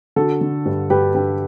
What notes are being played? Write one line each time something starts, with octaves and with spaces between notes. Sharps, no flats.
D3 F#4 A4
D3
G2
G2 G4 B4
D3 G4 B4